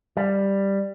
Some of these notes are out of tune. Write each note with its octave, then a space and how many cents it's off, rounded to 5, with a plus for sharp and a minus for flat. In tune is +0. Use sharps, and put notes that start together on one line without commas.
G3 +5